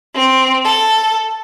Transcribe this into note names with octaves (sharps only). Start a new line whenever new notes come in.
C4
A4